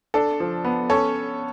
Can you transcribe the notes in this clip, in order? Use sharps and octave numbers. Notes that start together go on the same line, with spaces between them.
D4 A4
F3
B3
C#4 A4 C#5